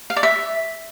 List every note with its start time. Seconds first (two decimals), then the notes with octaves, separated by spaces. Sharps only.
0.10 F5
0.16 D5
0.23 E5